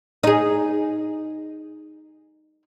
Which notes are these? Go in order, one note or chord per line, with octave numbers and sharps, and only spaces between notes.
D#4 G#4